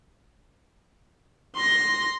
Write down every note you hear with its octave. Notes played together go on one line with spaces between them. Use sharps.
C6 A#6